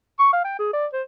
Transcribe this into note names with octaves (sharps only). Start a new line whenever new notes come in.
C#6
F5
G5
G#4
D5
C5